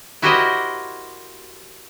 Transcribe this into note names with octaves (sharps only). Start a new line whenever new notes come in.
E4 F#4 G4 A#4 C5 D#5